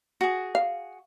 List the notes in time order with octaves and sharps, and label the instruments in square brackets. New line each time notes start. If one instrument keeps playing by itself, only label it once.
[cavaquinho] F#4 G#4
[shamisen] F5